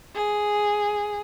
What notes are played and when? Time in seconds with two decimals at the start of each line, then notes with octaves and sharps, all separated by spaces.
0.16 G#4